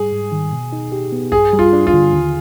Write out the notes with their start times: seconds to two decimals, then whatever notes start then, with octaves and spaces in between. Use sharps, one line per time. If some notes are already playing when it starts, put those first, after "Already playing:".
Already playing: G#2 G3 G#4
0.12 G#2
0.32 D#3
0.53 B2
0.73 D#4
0.92 G4
1.12 B3
1.32 G2 G#4
1.53 G3
1.59 F4
1.73 D4
1.87 F4
1.93 D3
2.13 D#2